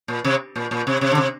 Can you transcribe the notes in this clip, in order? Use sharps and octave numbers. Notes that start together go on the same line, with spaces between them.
A#2
C3
A#2
A#2
C3
C3
D3
C3